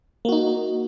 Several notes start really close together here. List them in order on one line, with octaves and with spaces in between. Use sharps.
A#3 F#4 D#4